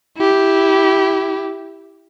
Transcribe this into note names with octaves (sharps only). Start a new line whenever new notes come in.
E4 G4